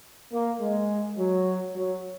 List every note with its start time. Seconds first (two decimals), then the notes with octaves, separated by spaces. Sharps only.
0.32 A#3
0.61 G#3
1.18 F#3
1.76 F#3